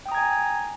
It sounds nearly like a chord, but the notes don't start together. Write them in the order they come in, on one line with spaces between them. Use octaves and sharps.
G5 D#6 A#5 G#6 G#5